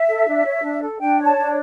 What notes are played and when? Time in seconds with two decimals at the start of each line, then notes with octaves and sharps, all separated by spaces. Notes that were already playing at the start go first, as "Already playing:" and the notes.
Already playing: E5
0.08 A4
0.27 D4
0.45 C#5
0.63 D4
0.81 A4
1.00 D4 G5
1.19 C#5
1.25 A5
1.37 D4